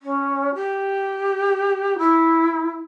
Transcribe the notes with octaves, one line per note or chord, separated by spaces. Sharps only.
C#4
G4
E4